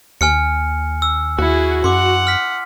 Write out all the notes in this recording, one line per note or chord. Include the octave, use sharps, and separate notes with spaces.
D#2 G#5 F6 C#7
E6
D#2 E4 F#4 G#4
F#2 F#5 C6 D6
F6 B6